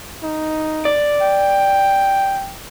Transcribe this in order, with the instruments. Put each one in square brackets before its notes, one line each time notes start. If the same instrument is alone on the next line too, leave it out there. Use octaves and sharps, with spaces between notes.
[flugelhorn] D#4
[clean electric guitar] D5
[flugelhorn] G5